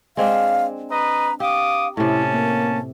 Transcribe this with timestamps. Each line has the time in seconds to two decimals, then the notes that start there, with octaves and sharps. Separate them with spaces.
0.17 G#3 C4 D4 F5
0.91 B4 D#5 A#5
1.40 G4 F5 D6 D#6
1.97 A2 C3 C#4 E4 A5
2.32 A#3